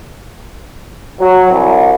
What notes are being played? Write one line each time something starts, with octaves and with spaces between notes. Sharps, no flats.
F#3
C2